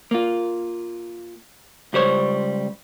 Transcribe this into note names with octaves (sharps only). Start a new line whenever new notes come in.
A#3 F4
C#2 G3 C5 C#5